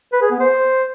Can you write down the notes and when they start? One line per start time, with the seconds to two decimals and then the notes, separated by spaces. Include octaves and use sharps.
0.13 B4
0.22 G#4
0.31 B3
0.40 C5